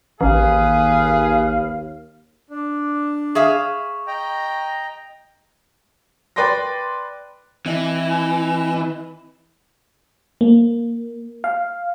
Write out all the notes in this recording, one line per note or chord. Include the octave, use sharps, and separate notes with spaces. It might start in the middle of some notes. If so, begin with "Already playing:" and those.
A1 D#2 G#4 B4 F5
D4
G#4 E5 F5 C#6
D#5 G5 A#5
B4 D5 G5 C6 A#6
E3 C4 D#5
A#3
F5